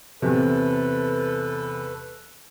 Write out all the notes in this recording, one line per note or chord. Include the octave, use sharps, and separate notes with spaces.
E2 C3 A4 B4